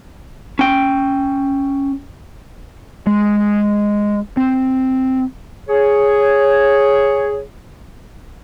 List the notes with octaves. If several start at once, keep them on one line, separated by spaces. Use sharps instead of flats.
C#4 G5
G#3
C4
G#4 C#5